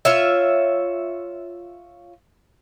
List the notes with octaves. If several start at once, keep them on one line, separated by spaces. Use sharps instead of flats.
F4 C#5 E5